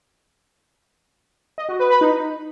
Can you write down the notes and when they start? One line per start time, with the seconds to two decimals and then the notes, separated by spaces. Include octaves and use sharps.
1.58 D#5
1.69 F#4
1.79 B4
1.90 B4
2.01 D#4